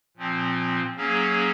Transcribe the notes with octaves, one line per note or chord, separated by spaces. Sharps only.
A#2 F3 C4
F#3 A#3 C#4 G#4